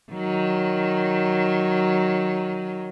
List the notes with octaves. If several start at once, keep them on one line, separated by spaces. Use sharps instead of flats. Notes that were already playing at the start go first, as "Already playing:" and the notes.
D#3 F#3